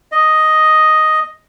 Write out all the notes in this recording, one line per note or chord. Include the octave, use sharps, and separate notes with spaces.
D#5